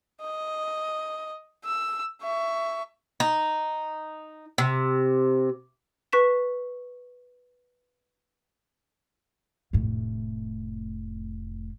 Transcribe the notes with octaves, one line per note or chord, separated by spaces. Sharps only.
D#5
E6
E5 C#6
D#4
C3
B4 C#6 B6 E7
F1 A2